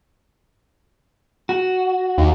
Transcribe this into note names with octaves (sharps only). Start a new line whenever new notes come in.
F#4
D#2